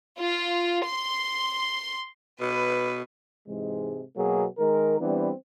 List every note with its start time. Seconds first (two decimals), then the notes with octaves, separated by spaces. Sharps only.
0.18 F4
0.85 C6
2.41 B2 B4
3.48 G#2 C3 E3 G#3
4.17 B2 F#3 A#3 B3 G#4
4.58 D#3 G#3 A#4
5.01 E3 G3 B3 C4 D4